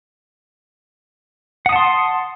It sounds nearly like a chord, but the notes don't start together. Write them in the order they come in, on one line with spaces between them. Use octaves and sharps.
F#5 D#6 A5 C6